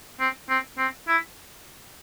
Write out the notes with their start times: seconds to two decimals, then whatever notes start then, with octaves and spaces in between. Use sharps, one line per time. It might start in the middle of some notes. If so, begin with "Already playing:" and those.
0.20 C4
0.49 C4
0.78 C4
1.08 E4